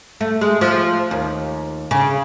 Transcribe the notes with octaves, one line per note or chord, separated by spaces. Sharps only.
A3
G#3
F3
D#2
C#3